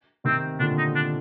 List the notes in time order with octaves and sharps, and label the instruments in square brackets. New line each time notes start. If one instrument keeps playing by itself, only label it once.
[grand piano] C3 D#3 [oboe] C4
[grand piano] A#2 D3 [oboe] D4
[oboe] D#4
D4